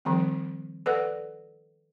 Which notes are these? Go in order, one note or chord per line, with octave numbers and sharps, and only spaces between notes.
D#3 F3 G3 C4
A4 B4 D5 F#5